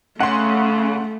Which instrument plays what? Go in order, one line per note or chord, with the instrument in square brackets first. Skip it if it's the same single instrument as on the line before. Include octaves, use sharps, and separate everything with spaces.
[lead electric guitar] C#3 [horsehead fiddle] A3 [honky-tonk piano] F#5 C6